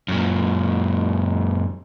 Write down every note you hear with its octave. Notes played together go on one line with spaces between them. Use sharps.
F#2 A#2